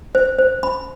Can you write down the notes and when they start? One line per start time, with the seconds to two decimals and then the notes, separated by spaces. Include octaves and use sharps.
0.15 C5
0.39 C5
0.63 B5